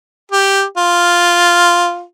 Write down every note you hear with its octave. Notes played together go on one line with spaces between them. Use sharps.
G4
F4